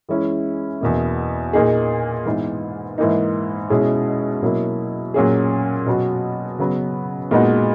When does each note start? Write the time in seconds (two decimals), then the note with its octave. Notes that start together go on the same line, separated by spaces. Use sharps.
0.09 E3 G#3 C#4 E4
0.81 E2 B2 A#3
1.53 A#2 A#3 D#4 G#4
2.25 G#2 E3 B3 D#4
2.98 G#2 E3 A#3 D#4
3.70 B2 G#3 C#4 E4 G#4
4.42 B2 F#3 A#3 E4
5.14 A#2 F#3 C#4 G#4
5.86 B2 F#3 B3 F#4
6.59 C#3 F#3 B3
7.31 A#2 G#3 B3 D#4 F#4